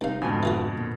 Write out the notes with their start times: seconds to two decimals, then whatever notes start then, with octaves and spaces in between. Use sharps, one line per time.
0.01 C2 D#4 C5 F5
0.22 F2 G#2 B2 D3 D4 G#5
0.43 E3 F4 F#4
0.77 A#2